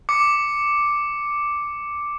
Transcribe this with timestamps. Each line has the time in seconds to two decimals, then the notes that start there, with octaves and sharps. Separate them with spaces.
0.09 D6 C#7